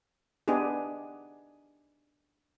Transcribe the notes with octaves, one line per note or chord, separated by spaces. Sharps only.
B3 D4 D#4 G4 G#4